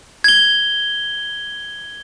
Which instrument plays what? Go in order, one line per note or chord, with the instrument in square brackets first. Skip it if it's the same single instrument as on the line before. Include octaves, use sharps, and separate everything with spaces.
[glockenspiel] G#6 G7